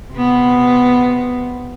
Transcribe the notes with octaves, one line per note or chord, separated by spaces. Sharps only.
C3 B3